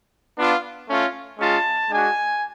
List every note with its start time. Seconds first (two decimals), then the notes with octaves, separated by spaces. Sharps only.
0.37 B3 D4 F4
0.87 A3 C#4 F4
1.39 G#3 C#4 F4 A5
1.90 G#3 D4 F#4 G#5